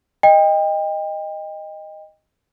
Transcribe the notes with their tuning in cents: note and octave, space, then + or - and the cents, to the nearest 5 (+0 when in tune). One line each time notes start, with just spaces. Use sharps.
D#5 +0 G5 +30